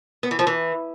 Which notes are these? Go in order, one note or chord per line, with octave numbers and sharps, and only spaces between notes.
B3
E3
F3
E3